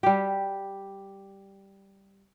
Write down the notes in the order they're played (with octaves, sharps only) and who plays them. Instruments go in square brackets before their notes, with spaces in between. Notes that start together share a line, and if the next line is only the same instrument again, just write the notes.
[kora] G3 G4